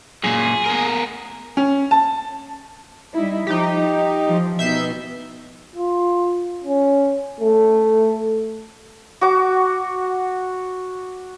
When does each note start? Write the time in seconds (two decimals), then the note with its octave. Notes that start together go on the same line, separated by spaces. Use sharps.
0.24 F#2 A#2 G#4
0.66 B3 A#4
1.57 C#4
1.91 A5
3.14 G3 D#4 E4
3.47 F3 D#4 G4
4.27 E3 F3
4.59 B2 B3 D#4 E5 G6 C7
5.76 F4
6.64 C#4
7.40 A3
9.21 F#4 D6